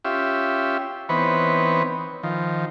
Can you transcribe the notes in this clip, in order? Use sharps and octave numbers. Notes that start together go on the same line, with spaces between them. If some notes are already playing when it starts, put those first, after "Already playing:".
C#4 F4 G4 E5
E3 B3 C4 D#4 B4 C#5
D#3 F3